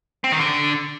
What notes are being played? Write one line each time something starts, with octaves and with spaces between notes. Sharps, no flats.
C4
D#3
D3